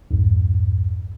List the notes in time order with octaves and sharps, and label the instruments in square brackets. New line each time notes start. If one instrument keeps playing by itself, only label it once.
[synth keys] C2 F2 G#2